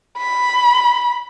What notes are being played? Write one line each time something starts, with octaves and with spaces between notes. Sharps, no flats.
B5